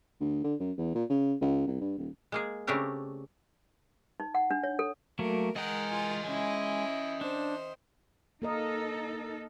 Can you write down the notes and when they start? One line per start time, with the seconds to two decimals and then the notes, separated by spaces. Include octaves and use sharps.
0.20 D2
0.44 D3
0.60 F#2
0.77 E2
0.95 A#2
1.10 C#3
1.41 C#2
1.67 C2
1.81 G2
1.97 D#1
2.32 G#3 A#3 G#4
2.67 C#3 A3 C4 D4 G4 A#4
4.20 D#4
4.35 F#5
4.51 D4
4.63 C#5
4.79 A4
5.19 F#3 A3 A#3 A#4
5.56 G#3 A#4 D#5 F#5 G5
5.90 F4 G#5
6.25 G#3 C#4 E4
7.21 D4 C5
8.42 A#3 D#4 A4 A#4 D#5